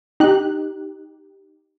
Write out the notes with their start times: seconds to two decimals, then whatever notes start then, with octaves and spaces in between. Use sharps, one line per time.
0.20 D#4 G4 F#6